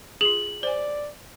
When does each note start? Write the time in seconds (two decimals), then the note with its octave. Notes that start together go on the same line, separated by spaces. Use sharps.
0.21 F4 G#4 F#7
0.63 C5 D5 G#5